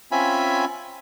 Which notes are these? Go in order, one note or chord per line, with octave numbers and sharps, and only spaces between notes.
C4 C#4 F4 E5 G#5 B5